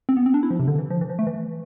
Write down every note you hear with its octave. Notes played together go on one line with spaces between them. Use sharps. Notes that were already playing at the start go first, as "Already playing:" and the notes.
C4
B3
C4
D4
E4
F3
C3
D3
E3
F3
E3
F3
A3
E3